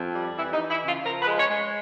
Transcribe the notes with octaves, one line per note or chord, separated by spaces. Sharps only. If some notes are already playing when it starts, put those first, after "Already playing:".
Already playing: F2
G3
E3 E4
D#4
E3
E4
C#3
F4
F3 A#4
B4
G#3
C#5
G#3